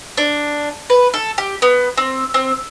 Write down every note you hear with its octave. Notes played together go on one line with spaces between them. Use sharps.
D4
B4
A4
G4
B3
C4
C4